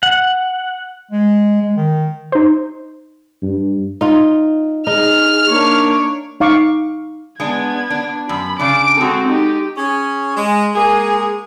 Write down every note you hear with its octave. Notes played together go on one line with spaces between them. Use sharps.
F#5
G#3
G#3
D#3
D#4 C5
G2
D#4 F4
D#4 G#4 F6
A#3 D4 C#5
D#4 F5 C#6 D6
G#3 B3 D4 G#6
D4
F#2 B5
C#3 D4 D6 D7
G#3 C4 F#4 A4
D#4 G4
C#4 G#4
G#3
G#3 A#3 G#4